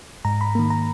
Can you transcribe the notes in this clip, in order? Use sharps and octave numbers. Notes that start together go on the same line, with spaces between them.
G#2 A#5
B5
D#3 A#3
A#5